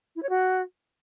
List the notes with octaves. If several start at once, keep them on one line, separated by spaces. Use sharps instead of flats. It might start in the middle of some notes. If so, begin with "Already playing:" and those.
E4
C#5
F#4